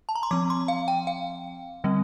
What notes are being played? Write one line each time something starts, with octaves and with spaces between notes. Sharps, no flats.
A5
A#5
C6
F3 C4 D6
C6
F5
G5
F5
D3 G3 C4